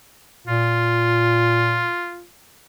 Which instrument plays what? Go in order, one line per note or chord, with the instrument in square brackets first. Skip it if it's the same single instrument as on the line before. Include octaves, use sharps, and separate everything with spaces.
[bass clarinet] A#2 [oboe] F4